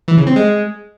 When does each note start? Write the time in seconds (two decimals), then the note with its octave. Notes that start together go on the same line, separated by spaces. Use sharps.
0.08 E3
0.17 C#3
0.27 C4
0.36 G#3